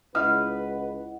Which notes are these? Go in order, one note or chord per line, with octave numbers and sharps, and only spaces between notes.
C#2 E4 B4 D#5 F#5 D#6 F6